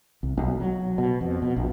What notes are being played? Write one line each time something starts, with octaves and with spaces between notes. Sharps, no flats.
C2
B1
F#3
B2
F2
B2
A#1